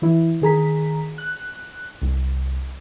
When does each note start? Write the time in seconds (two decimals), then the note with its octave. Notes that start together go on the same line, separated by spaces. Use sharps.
0.02 E3 E4
0.42 D#3 G#4 A#5 B6
1.18 F#6
2.02 C2